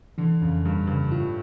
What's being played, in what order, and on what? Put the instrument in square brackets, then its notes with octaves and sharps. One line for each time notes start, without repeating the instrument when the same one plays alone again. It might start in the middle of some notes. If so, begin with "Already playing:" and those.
[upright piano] D3 [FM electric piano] E3
[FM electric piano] F2 [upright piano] C#3
[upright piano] G2 [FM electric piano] G3
[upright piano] G2 [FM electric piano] C#3
[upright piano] A2 [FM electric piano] F4